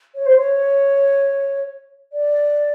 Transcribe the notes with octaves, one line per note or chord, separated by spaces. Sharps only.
C#5
C5
C#5
D5